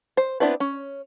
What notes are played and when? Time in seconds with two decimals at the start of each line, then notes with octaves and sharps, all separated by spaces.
0.17 C5
0.40 B3 C4 D4 E4 B4
0.60 C#4